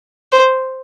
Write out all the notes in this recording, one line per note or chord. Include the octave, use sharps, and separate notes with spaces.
C5